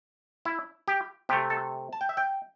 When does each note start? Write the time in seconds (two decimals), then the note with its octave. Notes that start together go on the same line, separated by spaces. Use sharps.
0.45 E4
0.88 G4
1.29 C3 G4
1.33 A3
1.50 A4
1.93 A5
2.01 G5
2.09 E5
2.17 G5